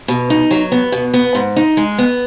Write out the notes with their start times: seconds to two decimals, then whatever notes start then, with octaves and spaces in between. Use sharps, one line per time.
0.08 B2
0.30 D#4
0.51 F#3
0.72 B3
0.92 B2
1.14 B3
1.35 G#2
1.56 D#4
1.77 G#3
1.98 B3